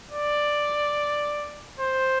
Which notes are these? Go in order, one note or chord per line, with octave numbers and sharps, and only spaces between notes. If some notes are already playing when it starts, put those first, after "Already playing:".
D5
C5